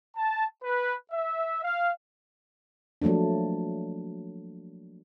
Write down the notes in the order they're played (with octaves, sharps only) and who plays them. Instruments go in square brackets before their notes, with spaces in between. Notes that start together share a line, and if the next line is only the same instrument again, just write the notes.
[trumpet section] A5
B4
E5
F5
[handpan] F3 F#3 A3 A#3 D4